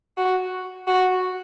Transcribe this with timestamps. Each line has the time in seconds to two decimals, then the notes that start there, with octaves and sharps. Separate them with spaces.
0.17 F#4
0.87 F#4